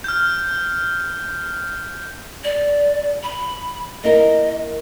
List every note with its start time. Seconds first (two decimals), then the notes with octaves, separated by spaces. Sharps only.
0.04 F6 G6
2.44 D5
3.23 B5
4.04 A#3 E4 A#4 D#5